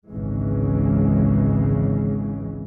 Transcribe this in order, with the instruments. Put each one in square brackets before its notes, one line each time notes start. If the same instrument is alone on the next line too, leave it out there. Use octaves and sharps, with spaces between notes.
[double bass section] G#1 C#2 C#3 E3 G#3